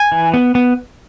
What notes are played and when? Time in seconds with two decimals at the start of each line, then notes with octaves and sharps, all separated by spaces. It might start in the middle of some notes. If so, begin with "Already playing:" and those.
Already playing: G#5
0.12 E3
0.34 B3
0.55 B3